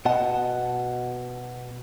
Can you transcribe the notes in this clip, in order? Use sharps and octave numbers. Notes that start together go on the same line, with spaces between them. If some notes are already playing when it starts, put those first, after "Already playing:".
B2 D#5 F#5 A5